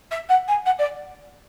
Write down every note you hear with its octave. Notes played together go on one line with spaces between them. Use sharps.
E5
F#5
G#5
F#5
D5